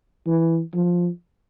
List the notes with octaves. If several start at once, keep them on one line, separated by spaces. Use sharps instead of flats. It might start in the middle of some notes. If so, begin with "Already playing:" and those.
E3
F3